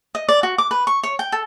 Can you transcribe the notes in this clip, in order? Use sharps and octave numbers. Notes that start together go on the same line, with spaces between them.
D#5
D5
F#4
D6
B4
C#6
C#5
G5
A4